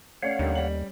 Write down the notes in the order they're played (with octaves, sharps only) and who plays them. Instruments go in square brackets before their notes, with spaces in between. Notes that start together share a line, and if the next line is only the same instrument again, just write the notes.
[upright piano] A3 C#4 D5 [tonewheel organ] C#5 F5 F#5
[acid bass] D#2 [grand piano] D3 D#3 G3
[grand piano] G3 F#7